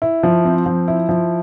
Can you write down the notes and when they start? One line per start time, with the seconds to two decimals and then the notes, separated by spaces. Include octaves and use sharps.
0.02 E4
0.23 F3
0.45 C4
0.66 F3
0.88 E4
1.09 F3